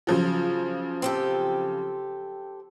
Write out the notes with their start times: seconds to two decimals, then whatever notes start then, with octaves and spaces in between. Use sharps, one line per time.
0.07 C#3 F3 F#3
1.02 C4 G4 A4